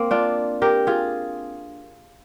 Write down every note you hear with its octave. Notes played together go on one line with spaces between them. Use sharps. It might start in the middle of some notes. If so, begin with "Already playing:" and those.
Already playing: A#3 C4
D4 F4
G4 A#4
F4 G#4